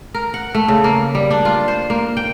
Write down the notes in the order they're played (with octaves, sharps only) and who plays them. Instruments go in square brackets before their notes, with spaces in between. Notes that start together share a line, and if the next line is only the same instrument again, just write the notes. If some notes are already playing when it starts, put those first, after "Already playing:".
[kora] A#4
F#5
A3
C#3
A#3
G3
D4
F4
C5
A#3
G5